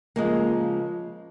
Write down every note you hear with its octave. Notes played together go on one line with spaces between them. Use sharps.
C#3 F3 G#3 A#3